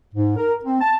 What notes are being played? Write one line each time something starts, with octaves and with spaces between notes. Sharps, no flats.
G#2
A#4
C4
A5